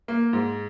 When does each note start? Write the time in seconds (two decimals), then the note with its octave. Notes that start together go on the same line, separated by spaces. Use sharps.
0.08 A#3
0.33 G#2